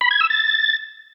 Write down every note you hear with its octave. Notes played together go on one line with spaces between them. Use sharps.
B5
G#6
E6
A6